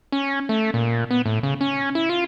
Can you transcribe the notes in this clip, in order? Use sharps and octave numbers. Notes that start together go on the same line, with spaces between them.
C#4
A3
A#2
B3
A2
C#3
C#4
E4
F4